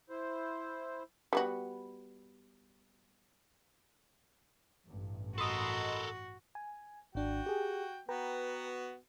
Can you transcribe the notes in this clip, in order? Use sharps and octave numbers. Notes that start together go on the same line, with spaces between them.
E4 C5
G3 B3 F#4
A1 G2
F#4 A4 A#4 D#5 B5 C6
G#5
G#1 D4 F#4 G5
G4 G#4
B3 F#4 B4 G5 A#5